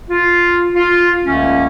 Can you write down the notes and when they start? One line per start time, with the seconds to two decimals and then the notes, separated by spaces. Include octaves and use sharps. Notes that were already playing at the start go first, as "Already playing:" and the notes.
0.10 F4
0.75 F4
1.24 C#2 D3 A3 A#3 C#4